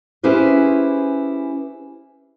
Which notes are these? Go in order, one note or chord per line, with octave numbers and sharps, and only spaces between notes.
C#4 E4 G4 G#4 B4 C5